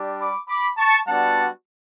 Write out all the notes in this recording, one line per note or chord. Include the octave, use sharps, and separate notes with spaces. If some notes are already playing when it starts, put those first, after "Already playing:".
Already playing: G3 D4 G4
B5 D6
B5 D6
A5 C#6
G3 B3 D4 F#4 F#5 A5